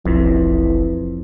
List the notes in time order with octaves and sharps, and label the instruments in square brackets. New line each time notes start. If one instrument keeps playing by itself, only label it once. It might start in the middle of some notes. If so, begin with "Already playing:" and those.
[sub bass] F1 [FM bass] B1 [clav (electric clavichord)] F2 [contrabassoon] E3